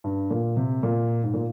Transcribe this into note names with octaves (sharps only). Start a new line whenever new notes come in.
G2
A#2
C3
A#2
G#2
A#2